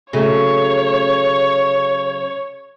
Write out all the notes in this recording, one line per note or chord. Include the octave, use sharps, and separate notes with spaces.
C#3 F#3 A3 C#5